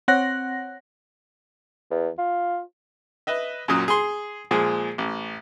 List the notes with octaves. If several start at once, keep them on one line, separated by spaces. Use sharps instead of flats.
C4 C#5 F#5 F#6 A#6
E2
F4
B4 D#5 E5
F#2 A#2 F#3 D#6
G#4 C6
A#2 F3 G#3 G#4
A1